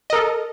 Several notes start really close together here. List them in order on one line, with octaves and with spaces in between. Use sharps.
D#5 A#4 A4